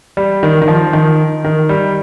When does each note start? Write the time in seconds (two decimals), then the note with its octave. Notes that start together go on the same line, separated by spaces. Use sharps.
0.17 G3
0.43 D#3
0.62 D#3
0.68 F3
0.93 D#3
1.44 D#3
1.69 G3